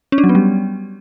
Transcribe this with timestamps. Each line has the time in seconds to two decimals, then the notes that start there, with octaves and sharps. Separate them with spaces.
0.12 C#4
0.18 D4
0.24 F#3
0.29 B3
0.35 G3